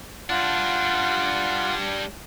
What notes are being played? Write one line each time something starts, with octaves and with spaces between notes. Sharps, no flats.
G3 D4 F4 F#5